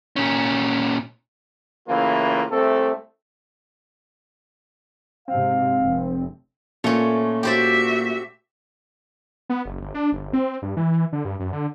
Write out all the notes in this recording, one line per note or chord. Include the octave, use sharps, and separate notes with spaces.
A#2 C#4
A2 C#3 E3 A#3 F4
C2 A3 C4 A4
G#2 C3 C4 F5
F1
A#2 A3 C#4
F#4 G4 C5 D5 E5
B3
F#1
G1
D4
G1
C4
G2
E3
D3
G2
F#2
D3